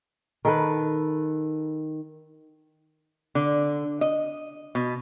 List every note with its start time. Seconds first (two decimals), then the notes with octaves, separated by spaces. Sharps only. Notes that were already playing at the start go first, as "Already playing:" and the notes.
0.45 D#3 A4 B4
3.35 D3
4.01 D#5
4.75 B2